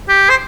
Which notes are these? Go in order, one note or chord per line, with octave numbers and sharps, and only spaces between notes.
G4
C5